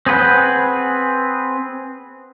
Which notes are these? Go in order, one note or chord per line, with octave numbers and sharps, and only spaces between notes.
C4 G#4 B4 F#5 G6